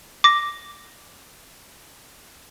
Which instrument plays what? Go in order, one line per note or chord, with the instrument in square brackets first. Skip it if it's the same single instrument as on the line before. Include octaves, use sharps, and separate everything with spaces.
[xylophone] D6 A#6